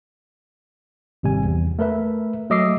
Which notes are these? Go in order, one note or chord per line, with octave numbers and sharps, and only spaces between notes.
G#1 C3 G3 G#5
E2
A3 A#4 B4 E5
F#3 A3 D#5 D6 E6 C7